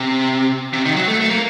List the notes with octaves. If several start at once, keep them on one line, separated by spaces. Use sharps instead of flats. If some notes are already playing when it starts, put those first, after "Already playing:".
Already playing: C3
C3
D#3
F#3
A3
A3
A#3